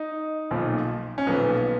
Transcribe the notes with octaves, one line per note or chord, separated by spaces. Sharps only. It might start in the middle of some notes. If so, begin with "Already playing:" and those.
Already playing: D#4
B1 A#2 F3
C#4
B1 A#2 F3 B3